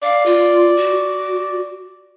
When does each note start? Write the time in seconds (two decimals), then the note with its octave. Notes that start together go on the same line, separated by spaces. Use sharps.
0.03 D5 F5
0.26 F4
0.77 F#4